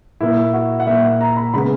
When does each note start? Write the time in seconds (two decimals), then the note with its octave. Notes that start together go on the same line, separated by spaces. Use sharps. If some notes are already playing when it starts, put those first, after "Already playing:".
0.21 A#2 A#3 E4
0.53 F#4
0.80 F#5
0.87 A#2 A#3 E5
1.04 F#5
1.21 A#5
1.37 B5
1.53 C#3 G#3 B3 B5